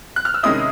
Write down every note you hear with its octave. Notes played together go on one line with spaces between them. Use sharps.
F#6
F6
E6
C3 D#3 G#3 C#4 E4 D#6